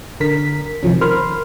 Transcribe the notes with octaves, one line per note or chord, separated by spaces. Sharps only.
D3 A#4 B6
C3 D#3 F3 C#4
A#4 C5 B5 C6 F6